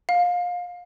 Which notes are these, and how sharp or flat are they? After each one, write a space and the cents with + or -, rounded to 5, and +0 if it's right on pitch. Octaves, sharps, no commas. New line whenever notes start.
F5 +25